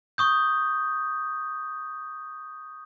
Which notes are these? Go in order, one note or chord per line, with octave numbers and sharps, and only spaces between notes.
C#6 D#6 G6